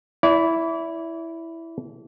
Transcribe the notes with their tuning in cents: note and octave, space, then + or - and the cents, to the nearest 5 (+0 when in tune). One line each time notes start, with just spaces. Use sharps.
E4 +0 D5 -35